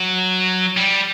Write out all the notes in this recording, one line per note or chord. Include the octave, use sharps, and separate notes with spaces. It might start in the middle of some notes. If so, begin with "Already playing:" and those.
Already playing: F#3
G3